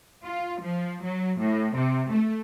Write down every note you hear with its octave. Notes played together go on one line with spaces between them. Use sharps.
F4
F3
F#3
A2
C3
A3